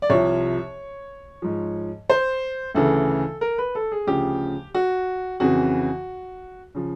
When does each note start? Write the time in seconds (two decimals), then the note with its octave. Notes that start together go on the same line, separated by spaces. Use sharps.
0.02 D5
0.10 C2 C3 F3 C#5
1.42 G#2 F3
2.10 C5
2.75 D2 C#3 E3 A4
3.41 A#4
3.58 B4
3.75 A4
3.92 G#4
4.07 D2 C#3 F3 G4
4.75 F#4
5.40 F2 C#3 E3 F#4
6.75 C#3 F3